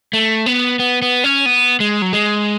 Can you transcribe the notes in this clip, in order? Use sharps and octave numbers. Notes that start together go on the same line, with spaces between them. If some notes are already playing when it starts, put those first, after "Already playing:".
A3
B3
B3
B3
C#4
B3
G#3
F#3
G#3